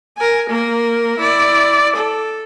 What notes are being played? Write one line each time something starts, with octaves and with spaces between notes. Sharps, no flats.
A#4 G#5
A#3 A#4
E4 D5
A4